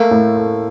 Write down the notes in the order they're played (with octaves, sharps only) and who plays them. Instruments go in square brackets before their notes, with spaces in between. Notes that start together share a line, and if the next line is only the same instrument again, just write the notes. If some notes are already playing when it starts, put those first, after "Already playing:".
Already playing: [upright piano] A3 [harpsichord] A#3
[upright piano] A2
A3